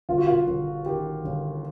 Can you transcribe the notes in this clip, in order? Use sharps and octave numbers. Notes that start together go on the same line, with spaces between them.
G1 F4
F#4
F4
G1
D#3 G4
G1